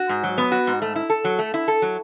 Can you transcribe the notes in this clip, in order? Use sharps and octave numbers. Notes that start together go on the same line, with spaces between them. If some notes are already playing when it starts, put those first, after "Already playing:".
Already playing: F#4
G#2
F#3
B3
F#4
G#2
A3
E4
A4
F#3
A3
E4
A4
F#3